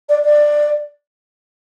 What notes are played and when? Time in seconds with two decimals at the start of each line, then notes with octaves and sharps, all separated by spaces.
0.09 D5
0.25 D5